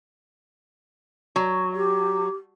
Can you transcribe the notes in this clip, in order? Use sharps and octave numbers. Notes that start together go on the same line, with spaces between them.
F#3
G4